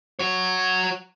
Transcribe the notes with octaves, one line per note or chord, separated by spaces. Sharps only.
F#4 C#5